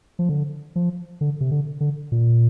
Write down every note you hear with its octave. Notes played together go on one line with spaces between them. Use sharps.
F3
D3
F3
D3
C3
D3
D3
A#2